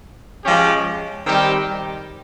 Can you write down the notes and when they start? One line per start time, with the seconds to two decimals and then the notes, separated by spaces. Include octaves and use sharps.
0.45 F3 G#3 C#4 G4
1.26 D#3 G3 C4 D#4 G4